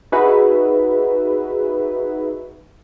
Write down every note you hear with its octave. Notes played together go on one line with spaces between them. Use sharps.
D#4 F#4 G#4 B4 E5